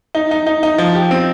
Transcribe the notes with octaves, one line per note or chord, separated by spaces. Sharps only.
D#4
D#4
D#4
D#4
F3
G4
C4